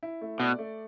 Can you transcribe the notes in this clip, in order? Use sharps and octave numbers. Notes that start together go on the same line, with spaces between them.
E4
A3
B2 D5
A3